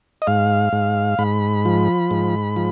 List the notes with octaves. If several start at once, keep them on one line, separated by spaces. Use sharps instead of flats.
D#5
G#2 F5
G#2
G#2 B5
F3
G#2
F3